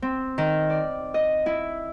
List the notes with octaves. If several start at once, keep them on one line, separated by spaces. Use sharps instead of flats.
C4
D#3
D5
D#5
E4